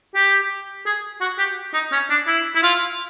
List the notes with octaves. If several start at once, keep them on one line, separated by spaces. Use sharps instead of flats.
G4
G#4
F#4
G4
D#4
C#4
D4
E4
E4
F4